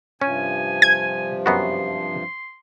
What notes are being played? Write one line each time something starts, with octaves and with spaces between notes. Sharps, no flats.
G2 C3 F3 C#4 G#5
G#6
F#2 B3 F#4 C6